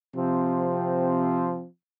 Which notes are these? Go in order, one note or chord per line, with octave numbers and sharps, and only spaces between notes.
C3 F3 C4